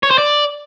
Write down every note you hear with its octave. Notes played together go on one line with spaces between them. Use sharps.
C#5
C5
D5